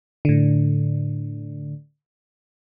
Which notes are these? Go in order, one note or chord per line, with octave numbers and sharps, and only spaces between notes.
A2 D3